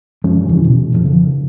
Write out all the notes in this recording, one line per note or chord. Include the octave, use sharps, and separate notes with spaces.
F#2 F3 G#3 C#4
E2 C#3 E3
B2
F2 D#3 F3
C#3 F3